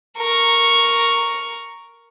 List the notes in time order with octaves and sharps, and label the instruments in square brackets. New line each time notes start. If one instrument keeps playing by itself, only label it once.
[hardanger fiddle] A#4 C#6